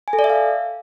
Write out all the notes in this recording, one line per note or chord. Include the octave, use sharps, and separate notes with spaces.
G#5
A4
D5
E5
F5